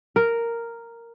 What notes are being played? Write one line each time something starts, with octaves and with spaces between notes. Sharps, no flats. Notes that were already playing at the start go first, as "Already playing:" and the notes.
A#4